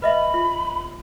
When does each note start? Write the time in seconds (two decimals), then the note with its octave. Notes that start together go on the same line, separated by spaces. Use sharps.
0.02 B4 D#5 E5 B5
0.34 F4